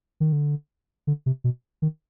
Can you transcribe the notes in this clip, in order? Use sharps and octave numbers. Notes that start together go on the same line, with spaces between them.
D#3
D3
D3
C3
B2
D#3